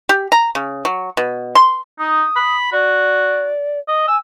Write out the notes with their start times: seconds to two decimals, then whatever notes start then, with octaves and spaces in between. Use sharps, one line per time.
0.09 G4
0.32 A#5
0.55 C#3
0.85 F#3
1.17 B2
1.55 C6
1.99 D#4 D#6
2.36 B5
2.72 F#4 D5
3.88 D#5
4.08 G#5 E6